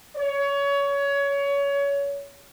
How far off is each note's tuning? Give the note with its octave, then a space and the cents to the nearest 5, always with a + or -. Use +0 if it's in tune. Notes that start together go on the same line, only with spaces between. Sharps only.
C#5 +25